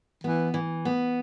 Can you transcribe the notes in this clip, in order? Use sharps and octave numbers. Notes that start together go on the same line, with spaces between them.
E3 B3
E3
B3